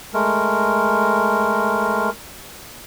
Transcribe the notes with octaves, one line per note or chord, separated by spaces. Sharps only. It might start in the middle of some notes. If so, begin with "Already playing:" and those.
G#3 A3 A#4